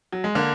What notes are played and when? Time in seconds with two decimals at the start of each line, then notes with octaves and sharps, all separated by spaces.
0.13 F#3
0.24 G#3
0.35 D3 A#3